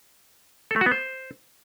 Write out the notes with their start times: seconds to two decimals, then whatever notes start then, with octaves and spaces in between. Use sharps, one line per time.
0.71 A4
0.76 A3
0.81 F#4
0.86 B3
0.91 C5